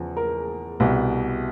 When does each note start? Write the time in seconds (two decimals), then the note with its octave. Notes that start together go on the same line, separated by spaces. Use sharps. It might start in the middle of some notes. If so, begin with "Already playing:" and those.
Already playing: E2 C#3 F3
0.17 A#4
0.80 C2 B2